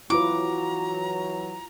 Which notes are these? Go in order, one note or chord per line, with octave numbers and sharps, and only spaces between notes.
E3 F#3 E4 F4 B4 A#5 D6